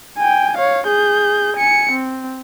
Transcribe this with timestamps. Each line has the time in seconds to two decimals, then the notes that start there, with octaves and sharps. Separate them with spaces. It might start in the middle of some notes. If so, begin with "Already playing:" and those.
0.17 G5 G#5
0.57 C#5 F5
0.87 G#4 G6
1.56 G#5 C#7
1.92 C4